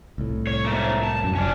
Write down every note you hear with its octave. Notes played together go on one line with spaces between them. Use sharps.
C2 A2
C#5
G#2 A3 A#3
A5
F#2
F#1 C#4 D4